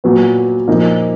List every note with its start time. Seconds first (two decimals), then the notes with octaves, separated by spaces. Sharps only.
0.04 A#2 F#3 B3
0.68 A#2 F3 A#3 D#4